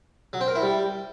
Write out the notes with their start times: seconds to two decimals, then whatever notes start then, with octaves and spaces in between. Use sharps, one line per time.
0.33 F#3
0.41 C4
0.48 A#4
0.55 E4
0.62 G3